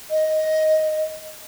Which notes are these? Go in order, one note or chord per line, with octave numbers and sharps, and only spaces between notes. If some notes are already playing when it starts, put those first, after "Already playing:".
D#5